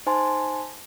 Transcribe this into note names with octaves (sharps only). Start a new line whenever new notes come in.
D#4 C5 G#5 A5 C6